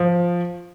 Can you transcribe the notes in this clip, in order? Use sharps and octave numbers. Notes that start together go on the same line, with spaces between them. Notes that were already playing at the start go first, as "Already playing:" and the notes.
Already playing: F3